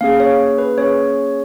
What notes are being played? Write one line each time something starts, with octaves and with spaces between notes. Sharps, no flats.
A#3 C#4 G#4 F5
C#5
B4
A#3 C#4 G#4 C#5